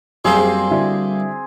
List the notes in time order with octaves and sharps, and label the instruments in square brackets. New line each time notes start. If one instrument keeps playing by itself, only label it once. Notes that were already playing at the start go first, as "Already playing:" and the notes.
[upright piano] F#2 C7 [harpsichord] G3 A#3 C5 [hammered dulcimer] C4 G#4
[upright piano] D3 E4 F#4